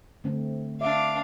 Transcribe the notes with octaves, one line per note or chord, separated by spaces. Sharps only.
D3 A3 C4
D4 E5 F5 D6